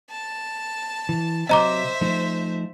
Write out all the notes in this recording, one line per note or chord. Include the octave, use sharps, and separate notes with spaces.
A5
E3
C3 F#3 C4 C5 D#5 E5 A#5 D6
F3 A3 D#4